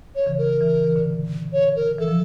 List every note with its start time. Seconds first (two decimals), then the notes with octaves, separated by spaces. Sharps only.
0.16 C#5
0.26 C#3 E3
0.38 A#4
0.61 C#3 E3
0.84 E3
0.96 A#2 D3
1.53 C#5
1.76 A#4
1.98 E3 A4
2.08 F3